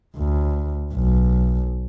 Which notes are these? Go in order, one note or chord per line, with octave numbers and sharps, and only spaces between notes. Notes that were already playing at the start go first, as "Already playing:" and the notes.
D2
B1